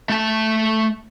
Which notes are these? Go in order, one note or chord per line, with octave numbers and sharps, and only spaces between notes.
A3 A5